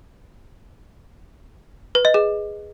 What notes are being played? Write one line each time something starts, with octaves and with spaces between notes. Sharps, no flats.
B4
D#5
G#4